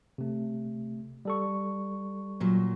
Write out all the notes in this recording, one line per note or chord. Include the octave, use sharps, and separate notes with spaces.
C3 A3
G3 A4 C#6
A#2 F#3